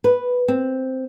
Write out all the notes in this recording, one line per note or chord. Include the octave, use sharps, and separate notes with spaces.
B4
C4